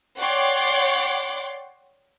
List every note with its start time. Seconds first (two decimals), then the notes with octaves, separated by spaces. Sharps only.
0.18 C#5 D5 F#5 G5 C6 D6